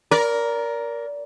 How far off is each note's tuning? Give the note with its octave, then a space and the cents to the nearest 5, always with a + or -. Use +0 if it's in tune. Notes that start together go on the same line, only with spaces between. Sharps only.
A#4 +10 D5 -25